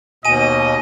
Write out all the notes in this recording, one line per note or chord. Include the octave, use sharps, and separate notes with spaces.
D#2 B2 D#5 G#5 D#7